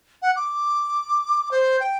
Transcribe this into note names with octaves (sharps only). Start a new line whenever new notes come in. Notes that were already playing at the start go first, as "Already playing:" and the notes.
F#5
D6
C5
G5